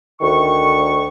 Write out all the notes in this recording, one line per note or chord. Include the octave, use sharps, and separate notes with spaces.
D2 D#3 C#6